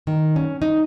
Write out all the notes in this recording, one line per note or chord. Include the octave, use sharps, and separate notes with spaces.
D#3
C#4
D#4